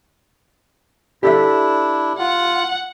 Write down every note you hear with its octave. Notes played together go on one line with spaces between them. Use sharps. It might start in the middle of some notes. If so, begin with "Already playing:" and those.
D4 E4 G4 A4 E5
F4 F#5